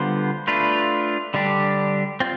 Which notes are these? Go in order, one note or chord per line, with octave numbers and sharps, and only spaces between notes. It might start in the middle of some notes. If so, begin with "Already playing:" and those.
Already playing: D3 G3 B3 F4 C5
A3 D4 F4 B4
D3 G3 D4 G4
C4 F4